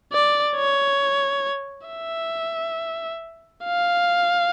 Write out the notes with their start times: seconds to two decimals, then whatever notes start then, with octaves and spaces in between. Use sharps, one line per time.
0.13 D5
0.56 C#5
1.88 E5
3.64 F5